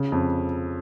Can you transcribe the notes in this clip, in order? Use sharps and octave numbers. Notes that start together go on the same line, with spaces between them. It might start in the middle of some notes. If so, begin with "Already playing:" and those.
Already playing: C#3
F2